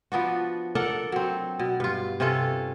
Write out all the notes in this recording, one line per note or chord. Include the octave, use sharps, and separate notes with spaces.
F3 B3 D4 F#4
D4 A4 A#4 F#5
F#3 C4
B2
G2 F4
C3 C#4 F4 A4